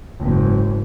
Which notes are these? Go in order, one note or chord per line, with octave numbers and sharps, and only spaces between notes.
F#1 G#2